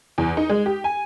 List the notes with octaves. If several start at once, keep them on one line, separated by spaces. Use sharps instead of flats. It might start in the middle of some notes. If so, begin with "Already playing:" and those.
E2
D#4
G#3
G4
G#5